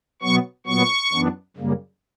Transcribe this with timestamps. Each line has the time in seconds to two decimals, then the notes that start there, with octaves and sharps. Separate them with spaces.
0.22 B2 F#3 B3 C#6
0.67 A#2 F#3 B3 C#6
1.12 F#2 E3 B3 D4
1.57 F#2 C#3 G3 A#3